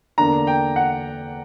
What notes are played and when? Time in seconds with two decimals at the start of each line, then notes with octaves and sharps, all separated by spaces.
0.18 E2 D3 A#3 D4 A#5
0.47 G5
0.76 F#5